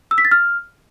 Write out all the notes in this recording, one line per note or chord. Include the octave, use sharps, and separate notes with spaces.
E6
B6
A6
F6